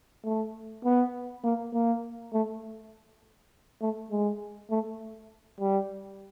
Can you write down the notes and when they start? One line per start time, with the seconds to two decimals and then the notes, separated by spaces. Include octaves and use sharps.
0.25 A3
0.85 B3
1.44 A#3
1.74 A#3
2.33 A3
3.81 A3
4.11 G#3
4.70 A3
5.60 G3